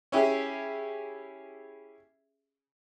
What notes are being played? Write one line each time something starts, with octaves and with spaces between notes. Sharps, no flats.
C#4 E4 G4 G#4